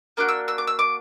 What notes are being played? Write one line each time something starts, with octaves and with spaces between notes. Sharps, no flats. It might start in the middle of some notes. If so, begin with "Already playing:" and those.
A#3 D4 F#4 D6
E6
E6
D6
E6
D6